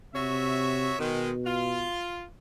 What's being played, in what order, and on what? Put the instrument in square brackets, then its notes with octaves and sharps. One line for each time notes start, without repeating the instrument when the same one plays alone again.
[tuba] C3 [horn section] F#4 C#5 E5
[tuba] B2 [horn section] D#3 G#3
[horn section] F4